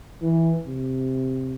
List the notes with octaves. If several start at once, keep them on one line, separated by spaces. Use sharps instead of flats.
E3
C3